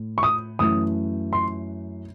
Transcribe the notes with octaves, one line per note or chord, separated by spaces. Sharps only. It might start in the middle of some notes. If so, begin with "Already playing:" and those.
Already playing: A2
C#6
D#6
F#2 E3 A3 D#6
C6